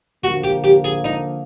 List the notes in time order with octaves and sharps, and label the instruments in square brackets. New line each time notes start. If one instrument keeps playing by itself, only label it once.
[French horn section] D3 F3 A#3 [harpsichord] F#4
[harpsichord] G4
G4
G#4
D#4